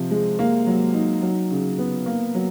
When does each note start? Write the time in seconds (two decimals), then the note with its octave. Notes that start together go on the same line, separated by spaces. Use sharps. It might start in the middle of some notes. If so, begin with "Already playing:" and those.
Already playing: C3 F3
0.11 G#3
0.39 A#3
0.67 F#3
0.94 D#4
1.22 F#3
1.51 C#3
1.78 B3
2.06 A#3
2.35 F#3